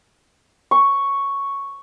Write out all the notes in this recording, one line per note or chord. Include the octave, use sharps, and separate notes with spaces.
C#6